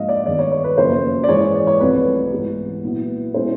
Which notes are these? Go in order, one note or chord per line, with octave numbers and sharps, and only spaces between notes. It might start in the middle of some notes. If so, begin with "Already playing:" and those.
Already playing: G#2 F3 A#3 D4 D#5 F5
D5
G2 D#3 G#3 B3 D5
C#5
C#5
B4
F#2 C#3 F3 A#3 C5
D5
G#2 E3 G#3 C#5
D5
C#5
C2 C3 F3 A3 B4
G#2 E3 G3 B3
A#2 F#3 B3 E4
B2 G#3 C#4 E4 C5